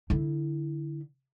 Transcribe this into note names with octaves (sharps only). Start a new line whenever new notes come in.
D3 E4